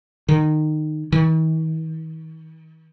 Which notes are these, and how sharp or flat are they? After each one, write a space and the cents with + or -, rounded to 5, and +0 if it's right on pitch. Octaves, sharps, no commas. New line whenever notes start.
D#3 -20
D#3 +45